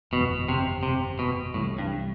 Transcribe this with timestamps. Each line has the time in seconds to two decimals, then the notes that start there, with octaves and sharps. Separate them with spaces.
0.12 G1 F2 B2 E3 B3
0.48 C3
0.83 C3
1.19 B2
1.54 C2 A2 C3 E3 G3
1.78 G2